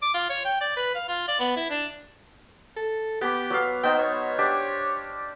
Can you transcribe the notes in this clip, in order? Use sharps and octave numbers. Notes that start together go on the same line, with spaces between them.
D6
F4
C#5
G5
D5
B4
F5
F4
D5
B3
E4
D4
A4
B3 G4 D6
F#3 B3 F5
B3 D#4 C5 G5
C#5
D4 G4 C5